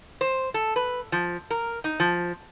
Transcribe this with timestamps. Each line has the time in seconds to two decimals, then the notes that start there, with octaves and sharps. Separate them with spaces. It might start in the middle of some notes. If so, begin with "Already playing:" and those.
0.21 C5
0.54 A4
0.76 B4
1.12 F3
1.51 A#4
1.84 D#4
2.00 F3